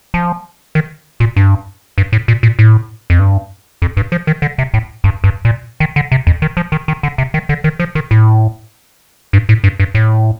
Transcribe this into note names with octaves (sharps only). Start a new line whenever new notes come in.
F3
D#3
A#2
G2
G2
A2
A#2
A#2
A2
F2
G2
F2
G2
F3
D#3
D3
C3
A2
G2
G2
A#2
D#3
D3
C3
F2
D#3
F3
D#3
D#3
D3
C3
D#3
D3
D#3
F3
D#3
A2
G2
A2
G2
G2
A2